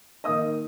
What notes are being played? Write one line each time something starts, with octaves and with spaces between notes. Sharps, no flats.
D#3 A#3 D#4 D#5 D#6